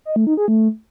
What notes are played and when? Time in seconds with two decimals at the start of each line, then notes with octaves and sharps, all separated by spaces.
0.05 D#5
0.16 A3
0.27 D#4
0.37 G#4
0.48 A3